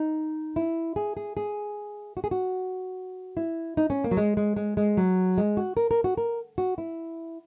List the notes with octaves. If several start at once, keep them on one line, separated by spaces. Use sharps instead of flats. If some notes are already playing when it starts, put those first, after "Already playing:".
Already playing: D#4
E4
G#4
G#4
G#4
F#4
G#4
F#4
E4
D#4
C#4
A#3
F#3
G#3
G#3
G#3
G#3
F#3
G#3
F#4
A#4
A#4
F#4
A#4
F#4
E4